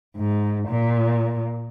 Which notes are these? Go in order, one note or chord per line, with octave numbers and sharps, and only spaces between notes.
G#2
A#2